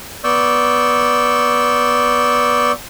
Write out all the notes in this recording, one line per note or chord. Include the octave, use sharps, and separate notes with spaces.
B3 D5 C#6 E6 G6